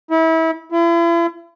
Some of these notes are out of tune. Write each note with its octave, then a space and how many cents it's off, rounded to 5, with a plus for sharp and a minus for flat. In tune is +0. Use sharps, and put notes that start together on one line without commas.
E4 -30
E4 +40